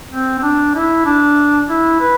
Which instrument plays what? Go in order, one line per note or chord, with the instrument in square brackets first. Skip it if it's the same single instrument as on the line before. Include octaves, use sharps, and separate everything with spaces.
[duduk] C4
C4
D4
E4
D4
E4
B4